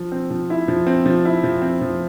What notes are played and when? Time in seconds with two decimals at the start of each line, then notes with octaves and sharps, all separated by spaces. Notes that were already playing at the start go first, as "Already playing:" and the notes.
Already playing: F3
0.12 C4
0.30 F3
0.50 E4
0.68 F3
0.87 C4
1.06 F3
1.25 E4
1.44 F3
1.62 C4
1.81 F3